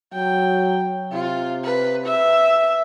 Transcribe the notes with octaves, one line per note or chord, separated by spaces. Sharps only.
F#3 G5
C3 F4
B4
E5